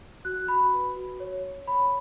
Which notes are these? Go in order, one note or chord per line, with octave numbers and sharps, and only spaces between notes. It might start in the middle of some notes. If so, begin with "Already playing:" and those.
F#4 F#6
F#4 B5
B4
F#4
C#5
C#5
C#5 B5